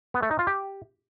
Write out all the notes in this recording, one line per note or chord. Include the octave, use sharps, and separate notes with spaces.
B3
A3
D#4
F4
G4